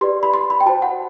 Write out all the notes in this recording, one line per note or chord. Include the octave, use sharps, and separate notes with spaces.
G4 B4 D5 C6
B5
C6
B5
G5
F#4 C5 A5
F#5